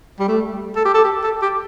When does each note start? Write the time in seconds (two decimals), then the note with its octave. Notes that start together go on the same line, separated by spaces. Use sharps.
0.19 G3
0.28 A3
0.76 A4
0.85 G4
0.94 A4
1.04 G4
1.23 A4
1.42 G4